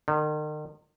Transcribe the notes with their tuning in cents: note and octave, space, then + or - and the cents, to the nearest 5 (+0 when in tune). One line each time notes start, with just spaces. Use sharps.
D#3 -40